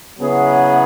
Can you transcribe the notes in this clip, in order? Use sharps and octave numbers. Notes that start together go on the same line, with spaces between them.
C#3 F#3 B3 E4 G#4